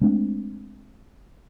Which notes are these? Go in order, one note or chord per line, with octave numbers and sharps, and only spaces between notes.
G#3 A3 C4 D4